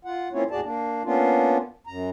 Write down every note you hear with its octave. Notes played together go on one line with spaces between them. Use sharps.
F4 F#5
A#3 C4 C#4 E4 F4 C#5
D#2 A2 F#4 G#4 D5 A5
A#3 D4
A#3 B3 C#4 D4 F4
F#2 A#5